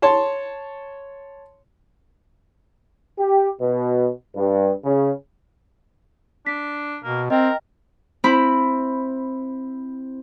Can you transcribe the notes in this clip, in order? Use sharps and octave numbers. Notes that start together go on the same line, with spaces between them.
C#5 A5 C6
G4
B2
G2
C#3
D4 B6
B2 A#3
C4 A#4 D#5 G5
C4 E4 B5